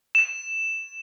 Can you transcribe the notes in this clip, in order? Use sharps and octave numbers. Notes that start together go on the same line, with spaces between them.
E7